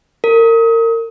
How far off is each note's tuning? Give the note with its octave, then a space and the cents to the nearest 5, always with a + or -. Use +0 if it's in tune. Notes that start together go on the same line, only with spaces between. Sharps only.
A#4 -30